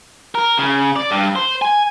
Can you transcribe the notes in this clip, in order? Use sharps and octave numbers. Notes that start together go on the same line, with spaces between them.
A#4
C#3
D5
G2
C5
G#5